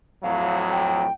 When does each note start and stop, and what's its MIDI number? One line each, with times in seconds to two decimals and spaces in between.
0.23 1.07 41
0.23 1.07 45
0.23 1.07 54
0.23 0.59 77
0.72 1.13 79